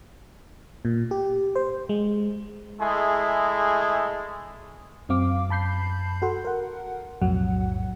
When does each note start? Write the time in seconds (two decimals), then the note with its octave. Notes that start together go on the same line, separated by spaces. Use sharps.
0.85 A#2
1.11 G4
1.55 C5
1.89 G#3
2.81 G#3 A3 E4 G#4
5.09 F#2 F#3 C4 F5 D6
5.49 F#2 A5 B5 G6 C7
6.22 F#4 A4 F#5 C6
6.45 A#4 F#5
7.21 B1 F2 A2 F#3 F#5